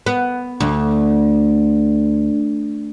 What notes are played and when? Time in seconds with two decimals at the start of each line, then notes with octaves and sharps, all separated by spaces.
0.06 B3
0.60 D2